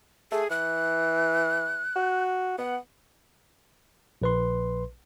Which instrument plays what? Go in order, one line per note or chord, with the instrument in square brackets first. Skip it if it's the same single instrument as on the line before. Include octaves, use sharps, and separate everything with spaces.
[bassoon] A3 [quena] G#4
[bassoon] E3 [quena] F#6
[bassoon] F#4
[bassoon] B3 [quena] F#5
[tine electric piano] A#1 B4 C6